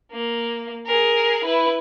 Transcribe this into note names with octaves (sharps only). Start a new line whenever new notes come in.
A#3
G#4 A#4
E4 B4